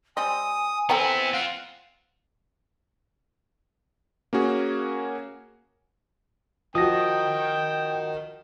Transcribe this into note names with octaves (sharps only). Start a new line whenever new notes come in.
G3 C4 D#5 G#5 D#6
B3 C4 E4 A4 G5 A#5
C4 F4 F5 F#5
A#3 C#4 F#4 G#4
F3 F#4 A#4 D#5 G5 D#6 A#6